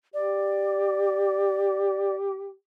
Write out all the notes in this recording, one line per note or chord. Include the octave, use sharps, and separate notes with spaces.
G4 D5